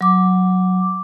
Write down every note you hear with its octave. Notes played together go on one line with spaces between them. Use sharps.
F#3 D6